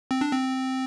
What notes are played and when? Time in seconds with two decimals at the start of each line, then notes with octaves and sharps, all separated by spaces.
0.11 C4
0.21 D4
0.32 C4